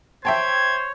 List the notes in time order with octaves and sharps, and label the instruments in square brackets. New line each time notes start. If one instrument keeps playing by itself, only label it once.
[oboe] C5 [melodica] C#5 [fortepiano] E5 G5 A5 [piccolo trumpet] G#6